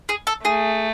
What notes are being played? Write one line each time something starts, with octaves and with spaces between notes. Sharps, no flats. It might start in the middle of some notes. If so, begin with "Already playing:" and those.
G#4
A4
A3 G#4